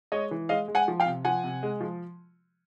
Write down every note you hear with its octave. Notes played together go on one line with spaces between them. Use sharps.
G#3 C#5 D#5
E3
G#3 D#5 F5
G#3
F#5 G#5
F3
F5 G5
C3
F3 F#5 G#5
C3
G#3
F3